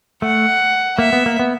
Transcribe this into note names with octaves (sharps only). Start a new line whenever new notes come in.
A3 F#5
A#3 E5
B3
A#3
B3